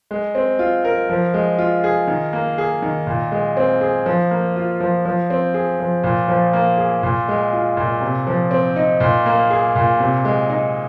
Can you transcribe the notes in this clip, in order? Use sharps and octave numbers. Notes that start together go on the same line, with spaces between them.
G#3
C4
F4
A#4
F3
G#3
F4
G#4
D#3
A#3
G#4
D#3
A#2
G#3
C4
G#4
F3
A#3
F4
F3
F3
C4
G#4
F3
A#2
F3
A#3
G#4
A#2
G#3
F4
A#2
C3
F3
C4
D#4
A#2
A#3
G#4
A#2
C3
G#3
D#4